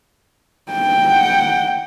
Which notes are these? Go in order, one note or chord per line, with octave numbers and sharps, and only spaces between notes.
G5
F#5